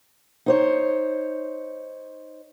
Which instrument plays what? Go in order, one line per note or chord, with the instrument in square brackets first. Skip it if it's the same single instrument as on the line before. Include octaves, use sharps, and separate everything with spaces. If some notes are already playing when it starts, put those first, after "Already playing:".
[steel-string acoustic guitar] D#4 C5 C#5